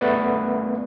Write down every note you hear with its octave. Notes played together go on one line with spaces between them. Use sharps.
A3 B3 B4 D5